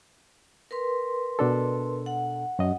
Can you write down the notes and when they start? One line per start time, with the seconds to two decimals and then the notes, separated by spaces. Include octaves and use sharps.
0.71 A#4 B4 C6
1.39 B2 D4 A4
2.06 F#5
2.59 F#2 D#5